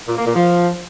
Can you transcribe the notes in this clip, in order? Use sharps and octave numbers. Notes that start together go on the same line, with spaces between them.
A#2
A#3
A#2
F3